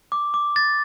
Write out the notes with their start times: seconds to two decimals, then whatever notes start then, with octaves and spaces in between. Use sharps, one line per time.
0.12 D6
0.34 D6
0.56 A6